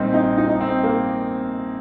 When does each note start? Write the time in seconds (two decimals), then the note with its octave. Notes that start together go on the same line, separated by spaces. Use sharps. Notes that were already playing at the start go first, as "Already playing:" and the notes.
Already playing: A#1 G3 A#3 C4 D#4
0.14 D#4
0.38 D#4
0.49 D#4
0.61 C4
0.84 A#3